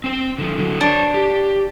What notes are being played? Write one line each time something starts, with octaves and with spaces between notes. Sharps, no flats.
C4 C5
D3 F3
D3 F#3
D4 C5 C#5
G4